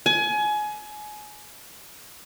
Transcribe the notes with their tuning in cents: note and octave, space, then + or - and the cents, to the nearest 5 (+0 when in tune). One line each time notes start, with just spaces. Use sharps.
G#5 +25